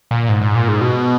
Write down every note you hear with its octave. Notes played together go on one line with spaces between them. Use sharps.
A#2
G#2
G#2
A#2
G#2
B2